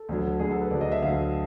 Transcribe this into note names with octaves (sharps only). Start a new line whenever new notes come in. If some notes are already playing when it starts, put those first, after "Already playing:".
Already playing: A4
D2 D3 F#3
D2 D3 F#3 G#4
A4
B4
D2 D3 F#3 D5
D#5
E5
D2 D3 F#3 F5